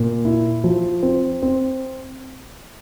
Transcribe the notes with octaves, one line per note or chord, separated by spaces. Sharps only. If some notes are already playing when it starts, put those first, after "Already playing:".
Already playing: A#2
E4
F3
C4
C4